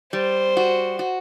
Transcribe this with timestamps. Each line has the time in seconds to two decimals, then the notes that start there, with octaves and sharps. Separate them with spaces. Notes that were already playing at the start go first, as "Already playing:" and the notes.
0.13 G3 C5
0.57 F#4
0.99 F#4